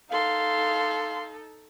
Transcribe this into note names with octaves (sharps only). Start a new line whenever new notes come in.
D#4 A4 F5 C6